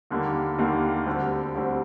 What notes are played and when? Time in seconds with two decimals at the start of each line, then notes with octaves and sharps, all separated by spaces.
0.11 D#2 D3 G3 A#3
0.58 D#2 D3 G3 A#3
1.06 D2 D3 G3 C4
1.55 D2 D3 G3 C4